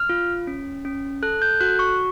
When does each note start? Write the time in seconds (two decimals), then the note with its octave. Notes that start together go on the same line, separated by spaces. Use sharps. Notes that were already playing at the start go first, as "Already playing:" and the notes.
Already playing: F6
0.09 F4
0.47 C#4
0.85 C#4
1.23 A4 F#6
1.42 G6
1.60 F#4 F#6
1.79 C#6